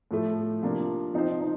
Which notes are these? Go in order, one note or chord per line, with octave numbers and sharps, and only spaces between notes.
A2 F3 A3
C3 F3 A#3 D4 F4
F3 C4 D#4 F4 C5
D#4